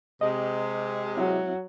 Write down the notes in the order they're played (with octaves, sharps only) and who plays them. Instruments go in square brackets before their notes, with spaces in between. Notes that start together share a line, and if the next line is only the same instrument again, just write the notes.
[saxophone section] C3 G#3 [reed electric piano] D#5
[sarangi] F#3 [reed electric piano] C4 E4 E5